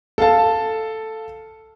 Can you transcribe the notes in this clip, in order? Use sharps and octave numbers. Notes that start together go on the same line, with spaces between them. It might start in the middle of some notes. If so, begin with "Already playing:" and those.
A4 F5 A5